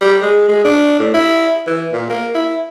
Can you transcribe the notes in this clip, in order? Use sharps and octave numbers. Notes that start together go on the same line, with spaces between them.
G3
G#3
G#3
D4
A2
E4
E3
A#2
A#3
E4